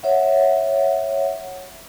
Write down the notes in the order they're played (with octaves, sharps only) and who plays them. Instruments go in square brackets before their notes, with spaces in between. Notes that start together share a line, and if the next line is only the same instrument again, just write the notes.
[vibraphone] C#5 E5 F#5